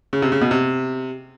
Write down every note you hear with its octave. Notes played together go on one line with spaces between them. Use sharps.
C#3
C3
C#3
B2
C3